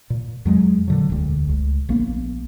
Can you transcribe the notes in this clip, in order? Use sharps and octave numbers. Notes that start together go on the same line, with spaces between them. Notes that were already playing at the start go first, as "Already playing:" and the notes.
A#2
F2 F#3 G#3
A#2 D3 F#3
E1 D2
C#2
A#1 A#3 B3